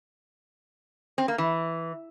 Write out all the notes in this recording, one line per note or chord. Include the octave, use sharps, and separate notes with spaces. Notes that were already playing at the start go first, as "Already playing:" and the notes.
C4
A#3
E3